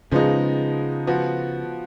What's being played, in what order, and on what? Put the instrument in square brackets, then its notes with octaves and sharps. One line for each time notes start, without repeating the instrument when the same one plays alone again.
[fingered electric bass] C#3 [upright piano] F3 G#3 B3 D#4
[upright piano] F3 B3 F#4